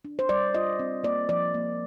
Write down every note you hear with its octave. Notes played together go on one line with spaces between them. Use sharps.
D4
C5
G3 D5
F4 D#5
C4
A#3 D5
F3 D5
A#3